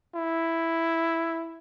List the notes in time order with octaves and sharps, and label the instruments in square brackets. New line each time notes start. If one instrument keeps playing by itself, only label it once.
[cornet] E4